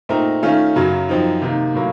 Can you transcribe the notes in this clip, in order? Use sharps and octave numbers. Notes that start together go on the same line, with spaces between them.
A#2 A3 C4 D#4 A#4
D#3 A3 C#4 F4
F#2 C#3 F#3
F#2 F3 C4 D#4
C3 D#3 A#3
A2 F#3 A#3